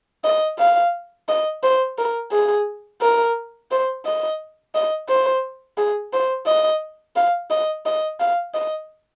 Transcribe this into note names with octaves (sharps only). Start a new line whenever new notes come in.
D#5
F5
D#5
C5
A#4
G#4
A#4
C5
D#5
D#5
C5
G#4
C5
D#5
F5
D#5
D#5
F5
D#5